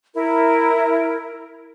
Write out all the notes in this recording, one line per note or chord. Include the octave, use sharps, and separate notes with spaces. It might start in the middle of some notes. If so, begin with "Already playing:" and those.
E4 A#4